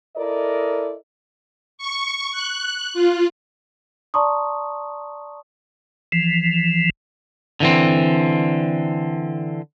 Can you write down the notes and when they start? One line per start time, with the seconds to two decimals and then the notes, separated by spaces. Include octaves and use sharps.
0.17 E4 A4 A#4 D5 D#5
1.78 C#6
2.32 F#6
2.94 F4
4.14 D5 A5 A#5 C6 C#6 D#6
6.12 E3 F3
7.60 D3 E3 C4